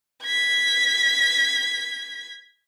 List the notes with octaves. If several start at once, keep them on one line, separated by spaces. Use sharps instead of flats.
G#6 B6